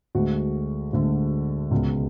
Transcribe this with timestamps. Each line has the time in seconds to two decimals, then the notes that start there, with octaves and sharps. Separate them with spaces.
0.15 D2 D3 G#3 F#4
0.93 D2 D3 G#3
1.71 C#2 B2 G#3